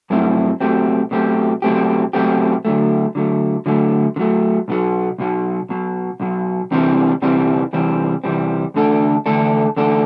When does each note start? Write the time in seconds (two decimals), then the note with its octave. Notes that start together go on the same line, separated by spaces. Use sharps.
0.10 G2 F#3 A3 C4 E4
0.60 B2 F#3 A3 C4 G4
1.11 B2 F#3 A3 C4 G4
1.62 B2 F#3 A3 C4 G4
2.13 B2 F#3 A3 C4 G4
2.65 D3 F#3 A3
3.15 D3 F#3 A3
3.66 D3 F#3 A3
4.16 D3
4.19 F#3 A3
4.68 B1 B2 F#3
5.18 B1 B2 F#3
5.69 B1 B2 F#3
6.20 B1 B2 F#3
6.71 E2 C3 E3 G3 C4
7.22 E2 C3 E3 G3 C4
7.73 E2 C3 E3 G3 C4
8.24 E2 C3 E3 G3 C4
8.74 E2 D3 A3 D4 A4
9.26 E2 D3 A3 D4 A4
9.76 E2 D3 A3 D4 A4